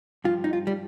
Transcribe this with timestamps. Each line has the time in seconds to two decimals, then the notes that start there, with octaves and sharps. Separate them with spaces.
0.24 G2 F3 F4
0.44 D#4
0.53 F4
0.67 G3